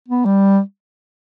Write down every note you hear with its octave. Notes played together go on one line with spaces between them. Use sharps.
B3
G3